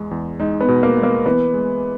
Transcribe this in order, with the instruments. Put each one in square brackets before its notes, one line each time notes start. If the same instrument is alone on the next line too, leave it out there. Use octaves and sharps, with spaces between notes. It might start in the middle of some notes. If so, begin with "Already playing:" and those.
Already playing: [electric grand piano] E2 G#3
E2
[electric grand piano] G#3 [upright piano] D#4
[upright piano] B3
[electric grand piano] B2
[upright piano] A#3
[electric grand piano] G#3
[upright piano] A#3
[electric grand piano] E3 [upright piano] B3
[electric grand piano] G#3